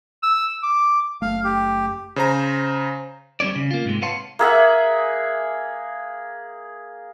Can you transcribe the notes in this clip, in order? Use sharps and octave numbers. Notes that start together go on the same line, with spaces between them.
E6
D6
F#1 A3 F5
G4
C#3 C5 A#5
G3 C4 C#4 C#5 D5
C#3
A#3 F4
G#2 C3 G#3
B4 C#5 F5 F#5 A5 C6
A#3 G#4 E5 F#5